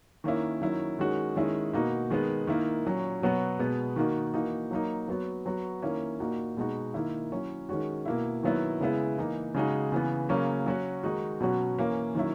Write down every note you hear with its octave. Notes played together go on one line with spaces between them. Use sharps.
D#3 A#3 C#4 E4
D#3 F#3 C#4 E4
D#3 G#3 C#4 F#4
D#3 G#3 C#4 E4
B2 A#3 D#4 F#4
D#3 G#3 B3
D#3 A#3 E4
A#2 F#3 C#4
B2 F#3 B3 F#4
B2 G#3 B3
D#3 A#3 D#4 F#4
E3 A#3 D#4 F#4
F#3 A#3 D#4
F#3 B3 F#4
F#3 B3 F#4
D#3 A#3 C#4 E4
A#2 A#3 D#4 F#4
B2 G#3 D#4 F#4
D#3 A#3 E4
F#3 C#4 E4
D#3 G#3 C#4 F#4
B2 A#3 E4
D#3 F#3 B3 E4
C#3 G#3 B3 E4
E3 A#3 D#4
C#3 G#3 D#4 F#4
C#3 E3 B3
C#3 F#3 A#3 C#4
F#3 C#4 F#4
D#3 G#3 D#4 F#4
B2 F#3 C#4 F#4
E3 A#3 C#4 E4
D#3 F#3 C#4 E4